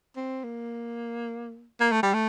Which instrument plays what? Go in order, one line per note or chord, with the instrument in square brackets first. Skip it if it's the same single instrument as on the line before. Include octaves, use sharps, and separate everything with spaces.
[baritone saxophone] C4
A#3
A#3
A3
G3
A3